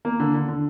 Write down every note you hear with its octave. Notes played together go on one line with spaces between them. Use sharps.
A#3
D3
D3
D3